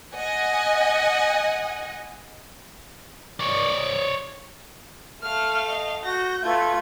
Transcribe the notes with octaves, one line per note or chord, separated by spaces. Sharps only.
D#5 F#5 G#5
C#5 D5
A3 F5 F6
D#5
F#4 G6 A#6
A3 F4 B4 G#6